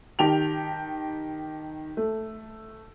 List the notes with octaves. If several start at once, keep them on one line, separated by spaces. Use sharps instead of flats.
D#3 G4 G5 A5 F7
A3